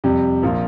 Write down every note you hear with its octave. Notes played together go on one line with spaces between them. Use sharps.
F2 C3 G3
A#1 F3 A#3 F4